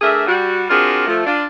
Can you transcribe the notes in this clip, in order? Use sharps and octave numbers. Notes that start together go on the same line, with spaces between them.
A3 D4 G#4 A#4 E5
G3 F#4
C4 D4 F4 F#4 G#4 A#4
F3 A3
D4 F4